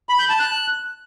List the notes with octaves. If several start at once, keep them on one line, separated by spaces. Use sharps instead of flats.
B5
G6
A5
F#6